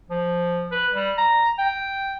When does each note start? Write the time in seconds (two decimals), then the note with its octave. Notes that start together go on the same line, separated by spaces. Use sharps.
0.10 F3
0.71 B4
0.93 G3
1.18 A#5
1.58 G5